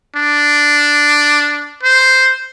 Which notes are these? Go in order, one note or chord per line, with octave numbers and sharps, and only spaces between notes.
D4
C5